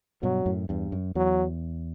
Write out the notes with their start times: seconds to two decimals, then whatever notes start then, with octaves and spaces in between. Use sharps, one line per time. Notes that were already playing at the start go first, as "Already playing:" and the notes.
0.23 G2 B2 F#3
0.46 F#2 A2
0.69 E2 G2
0.92 F#2
1.15 E2 F#3